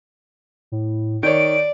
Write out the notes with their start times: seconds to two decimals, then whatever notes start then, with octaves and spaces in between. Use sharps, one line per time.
0.72 A2
1.23 D#3 C#5 D5 D7